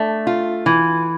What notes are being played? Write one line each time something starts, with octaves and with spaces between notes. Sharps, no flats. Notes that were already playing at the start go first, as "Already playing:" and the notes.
Already playing: A3 D4
F4
E3